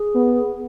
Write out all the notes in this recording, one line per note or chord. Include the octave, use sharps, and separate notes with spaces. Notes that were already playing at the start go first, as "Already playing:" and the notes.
Already playing: G#4
B3